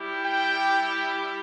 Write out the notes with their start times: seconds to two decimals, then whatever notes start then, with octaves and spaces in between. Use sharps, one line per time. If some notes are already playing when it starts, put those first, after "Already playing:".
Already playing: G3 E4 G4
0.24 G5